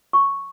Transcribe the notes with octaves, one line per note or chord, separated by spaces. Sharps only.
C#6